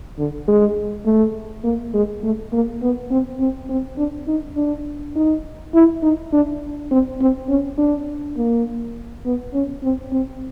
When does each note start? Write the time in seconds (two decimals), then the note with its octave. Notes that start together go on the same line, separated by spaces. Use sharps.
0.18 D3
0.48 G#3
1.06 A3
1.64 A#3
1.94 G#3
2.23 A3
2.52 A#3
2.82 B3
3.11 C4
3.40 C4
3.70 C4
3.98 D4
4.27 D#4
4.56 D4
5.16 D#4
5.74 E4
6.03 D#4
6.33 D4
6.91 C4
7.21 C4
7.49 C#4
7.78 D4
8.37 A#3
9.25 B3
9.54 C#4
9.83 C4
10.12 C4